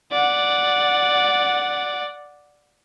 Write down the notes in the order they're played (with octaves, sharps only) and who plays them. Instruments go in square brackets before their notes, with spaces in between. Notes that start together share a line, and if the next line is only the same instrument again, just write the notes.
[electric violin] D5 F#5